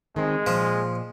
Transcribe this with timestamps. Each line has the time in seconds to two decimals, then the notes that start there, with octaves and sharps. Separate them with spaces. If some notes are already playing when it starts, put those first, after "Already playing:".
0.16 D#3 G#3 C4
0.47 A#2 F3